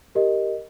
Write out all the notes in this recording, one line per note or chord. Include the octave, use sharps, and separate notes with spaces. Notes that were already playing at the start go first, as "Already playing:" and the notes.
G4 A#4 D#5